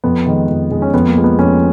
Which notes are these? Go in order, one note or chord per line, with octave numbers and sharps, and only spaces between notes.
F2 B3
D#3 G#3
F2
D#3 G#3
C#4
F2 B3
A#3
F3 G#3
B3
F2 C#4